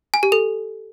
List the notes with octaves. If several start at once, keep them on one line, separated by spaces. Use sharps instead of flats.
G#5
G4
A4